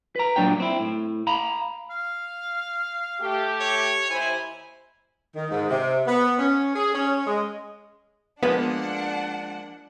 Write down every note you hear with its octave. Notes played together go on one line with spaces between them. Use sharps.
B4 A#5
A#2 F#3 D4 C#5 G5
C4 E4
A2
F5 A#5 B5
F5
A3 G4
C#5
D#2 E4 C5 G#5
D#3
G#2
C3
B3
C#4
G#4
C#4
G#3
F3 G#3 A#3 B3 D4 F#5